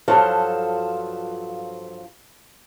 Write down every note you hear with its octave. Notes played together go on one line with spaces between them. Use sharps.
G2 F3 F#3 F4 A4 C5